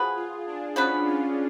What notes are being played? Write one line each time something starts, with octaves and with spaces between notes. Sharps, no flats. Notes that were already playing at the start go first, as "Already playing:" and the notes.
Already playing: F3 B3 F#4 G#4 B4
F4
D4
F3 B3 C#4 F#4 B4
F4